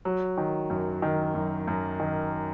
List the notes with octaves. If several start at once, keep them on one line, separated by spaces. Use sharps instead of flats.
F#3
D#3
F#2
D#3
F#2
F#2
D#3